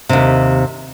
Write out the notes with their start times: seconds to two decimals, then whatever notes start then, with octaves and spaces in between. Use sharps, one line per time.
0.09 D#2 C3